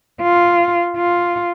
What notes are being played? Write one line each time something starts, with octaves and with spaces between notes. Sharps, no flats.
F4
F4